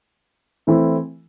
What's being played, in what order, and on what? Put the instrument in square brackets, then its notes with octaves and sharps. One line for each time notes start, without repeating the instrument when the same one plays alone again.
[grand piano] E3 A3 C4 E4